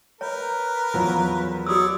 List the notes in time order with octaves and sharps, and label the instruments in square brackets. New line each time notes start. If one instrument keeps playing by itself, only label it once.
[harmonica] A#4 B4 [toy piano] C#5
[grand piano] E2 F3 F#3
[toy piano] F#4 D#6 E6 [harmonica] C#5 D5